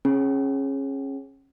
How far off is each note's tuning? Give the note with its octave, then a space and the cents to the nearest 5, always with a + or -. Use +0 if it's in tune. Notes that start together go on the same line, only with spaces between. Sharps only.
C#4 -25 G#4 +0